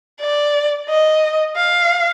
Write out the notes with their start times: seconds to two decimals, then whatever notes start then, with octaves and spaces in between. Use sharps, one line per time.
0.20 D5
0.89 D#5
1.56 F5